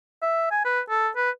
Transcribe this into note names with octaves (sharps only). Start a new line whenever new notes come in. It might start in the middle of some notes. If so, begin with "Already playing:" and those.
E5
G#5
B4
A4
B4